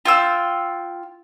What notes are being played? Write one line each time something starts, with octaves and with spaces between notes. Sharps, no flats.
F4 G5 E6